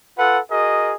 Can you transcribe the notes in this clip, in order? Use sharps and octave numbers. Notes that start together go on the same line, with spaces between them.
F4 A4 B4 F#5
F#4 G#4 A#4 D#5